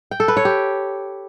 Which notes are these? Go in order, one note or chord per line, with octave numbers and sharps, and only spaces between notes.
G5
A4
B4
C#5
G4